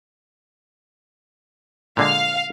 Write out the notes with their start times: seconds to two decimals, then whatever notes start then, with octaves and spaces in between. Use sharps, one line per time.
1.97 A#2 D3 G#3 F5